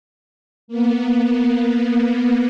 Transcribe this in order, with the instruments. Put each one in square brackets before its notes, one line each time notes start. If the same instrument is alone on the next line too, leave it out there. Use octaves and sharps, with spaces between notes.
[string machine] A#3 B3